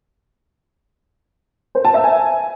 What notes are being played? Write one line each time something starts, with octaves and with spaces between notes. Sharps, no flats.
C5
A5
E5
G#5